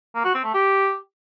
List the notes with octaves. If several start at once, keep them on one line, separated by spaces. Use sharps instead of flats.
A#3
F#4
C4
A3
G4